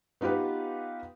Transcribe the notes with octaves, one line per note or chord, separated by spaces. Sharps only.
B3 D#4 F4 G4 B4